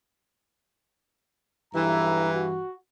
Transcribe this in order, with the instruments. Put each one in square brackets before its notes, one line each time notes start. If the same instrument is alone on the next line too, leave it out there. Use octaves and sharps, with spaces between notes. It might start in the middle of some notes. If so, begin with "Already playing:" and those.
[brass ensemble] B1 E4 A#5 [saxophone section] G2 E3
[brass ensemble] F#4